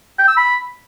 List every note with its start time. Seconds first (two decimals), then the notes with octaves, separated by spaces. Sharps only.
0.19 G5
0.28 E6
0.37 B5